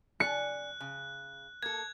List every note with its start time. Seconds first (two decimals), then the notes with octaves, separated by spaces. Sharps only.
0.20 C#4 D5 G#5 F#6 C#7
0.80 C#3
1.63 A#3 A4 G#6